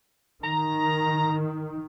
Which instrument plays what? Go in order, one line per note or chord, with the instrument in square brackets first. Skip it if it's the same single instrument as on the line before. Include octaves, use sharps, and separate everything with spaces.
[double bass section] D#3 [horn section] A#5